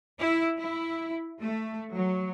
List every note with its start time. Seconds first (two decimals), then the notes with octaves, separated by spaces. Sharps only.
0.19 E4
0.59 E4
1.42 A3
1.93 F#3